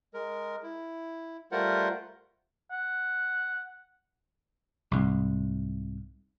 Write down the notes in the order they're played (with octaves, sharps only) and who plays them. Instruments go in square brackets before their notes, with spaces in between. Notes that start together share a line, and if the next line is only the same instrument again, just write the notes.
[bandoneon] G#3 A#4
E4
G3 A3 F4 A#4 C5 F#5
[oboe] F#5
[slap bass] C2 G#2